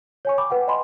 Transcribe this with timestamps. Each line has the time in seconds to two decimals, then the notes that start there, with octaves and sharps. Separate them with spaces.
0.25 C#5 G#5 C#6
0.38 G5 B5 D6
0.50 B4 F#5 G5
0.67 D5 D#5 G5 G#5 B5 C6